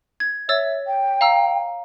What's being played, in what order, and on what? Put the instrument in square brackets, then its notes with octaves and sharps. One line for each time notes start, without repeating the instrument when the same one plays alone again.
[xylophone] G#6
[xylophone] C#5 E6 A6 [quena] E5
[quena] G5
[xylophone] F5 A#5 E6